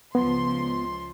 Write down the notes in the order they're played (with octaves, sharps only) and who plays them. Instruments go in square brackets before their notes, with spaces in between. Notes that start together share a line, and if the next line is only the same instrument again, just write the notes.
[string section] C#2 F3 C6 [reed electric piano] B3